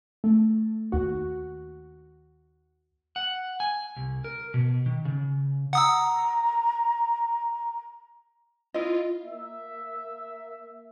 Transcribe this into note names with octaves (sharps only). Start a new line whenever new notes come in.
A3
D#2 F#4
F#5
G#5
C2
A#4
B2
D#3
C#3
F#5 A#5 D#6 E6
E4 F4 D#5
A#3 E5